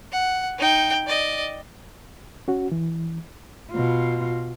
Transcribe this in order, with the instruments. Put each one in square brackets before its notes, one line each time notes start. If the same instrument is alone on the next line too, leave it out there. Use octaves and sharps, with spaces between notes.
[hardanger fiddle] F#5
D#4 G5
D5 D#5
[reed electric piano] C#4 F#4
E3
[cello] B2 F4